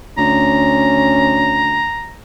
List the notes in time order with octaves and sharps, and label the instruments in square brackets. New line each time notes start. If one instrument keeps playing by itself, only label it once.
[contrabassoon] D2 [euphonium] C#4 [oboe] A#5